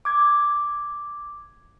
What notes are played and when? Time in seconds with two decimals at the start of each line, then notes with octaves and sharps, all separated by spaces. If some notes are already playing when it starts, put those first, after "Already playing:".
0.05 D6 G#6